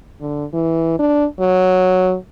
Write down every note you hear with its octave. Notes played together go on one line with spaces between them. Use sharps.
D3
E3
D4
F#3